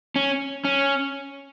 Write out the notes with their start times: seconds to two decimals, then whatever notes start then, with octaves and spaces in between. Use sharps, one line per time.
0.16 C#4
0.65 C#4